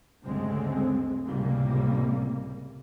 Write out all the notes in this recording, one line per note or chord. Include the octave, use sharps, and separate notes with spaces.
D2 G2 C#3 G#3 A3 C4
C#2 A2 C3 G3 A#3